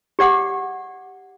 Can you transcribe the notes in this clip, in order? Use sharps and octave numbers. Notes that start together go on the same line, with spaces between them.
G4 D5 F#5 D6